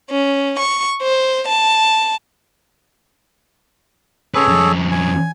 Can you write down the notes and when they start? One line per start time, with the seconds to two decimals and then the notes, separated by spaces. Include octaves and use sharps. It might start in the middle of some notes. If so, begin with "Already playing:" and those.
0.10 C#4
0.59 C#6
1.02 C5
1.48 A5
4.35 C#4 G#4 A4 B4 C#5
4.48 F2 C#4
4.91 G#5